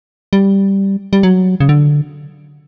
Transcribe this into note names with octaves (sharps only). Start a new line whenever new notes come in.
G3
G3
F#3
C#3
D3